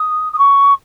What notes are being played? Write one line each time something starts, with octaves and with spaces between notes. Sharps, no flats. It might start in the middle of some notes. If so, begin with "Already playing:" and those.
Already playing: D#6
D#6
C#6